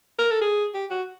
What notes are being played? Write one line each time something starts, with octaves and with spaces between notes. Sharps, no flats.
A#4
A4
G#4
G4
F#4